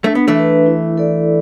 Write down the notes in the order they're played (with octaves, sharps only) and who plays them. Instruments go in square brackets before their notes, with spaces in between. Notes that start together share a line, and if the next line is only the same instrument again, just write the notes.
[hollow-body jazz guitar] A3 [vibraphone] D4
[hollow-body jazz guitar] B3
E3 A3
[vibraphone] B4 E5
E4
A4 D5